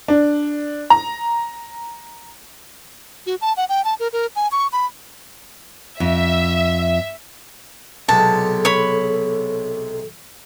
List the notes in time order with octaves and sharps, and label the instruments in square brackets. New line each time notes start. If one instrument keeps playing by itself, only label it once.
[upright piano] D4
A#5
[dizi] F#4
A5
F#5
G5
A5
A#4
A#4
G#5
C#6
B5
[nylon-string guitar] F2 [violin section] E5
[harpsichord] B1 C3 G#3 [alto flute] A4 [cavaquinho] A5
[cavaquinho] C#5 B5